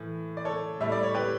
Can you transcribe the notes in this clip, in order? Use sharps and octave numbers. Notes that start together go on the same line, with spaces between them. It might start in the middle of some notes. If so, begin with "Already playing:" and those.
Already playing: A2 E3
D5
A4 C#5
A2 G3 E5
D5
C#5
G4 B4